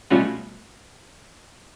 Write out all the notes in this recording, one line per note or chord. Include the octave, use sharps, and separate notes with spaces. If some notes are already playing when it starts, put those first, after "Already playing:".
B2 G3 A3 C#4 F4 F#4